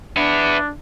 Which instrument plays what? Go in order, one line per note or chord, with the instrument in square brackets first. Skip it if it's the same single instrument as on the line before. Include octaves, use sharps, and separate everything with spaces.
[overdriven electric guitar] B3 E4 [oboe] D4